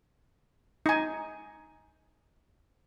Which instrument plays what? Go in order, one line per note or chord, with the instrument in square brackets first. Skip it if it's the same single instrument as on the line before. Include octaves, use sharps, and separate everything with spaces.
[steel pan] D#4 G#5